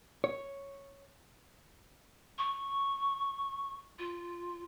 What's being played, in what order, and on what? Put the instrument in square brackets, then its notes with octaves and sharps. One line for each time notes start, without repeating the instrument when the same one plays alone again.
[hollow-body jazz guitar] C#5
[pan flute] C#6
F4